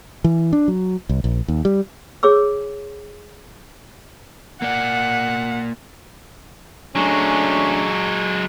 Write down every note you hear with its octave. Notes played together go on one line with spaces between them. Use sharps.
E3
D4
F#3
C2
A#1
D#2
G3
G#4 C#5 D6 E6
A#3 D5 F#5
F#3 G#3 A3 C#4 D4